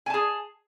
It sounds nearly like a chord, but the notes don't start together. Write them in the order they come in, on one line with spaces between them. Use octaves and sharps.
G#5 A5 G#4